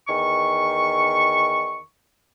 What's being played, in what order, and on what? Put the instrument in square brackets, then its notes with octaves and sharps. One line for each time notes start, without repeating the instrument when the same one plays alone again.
[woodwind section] E2 D#3 C#6